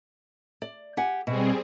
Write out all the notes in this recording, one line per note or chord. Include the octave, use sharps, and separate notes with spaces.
D5
G4 F#5 G#5
B2 G3 C4 G#4